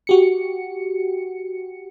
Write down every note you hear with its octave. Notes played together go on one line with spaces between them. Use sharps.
F#4 G4 C#7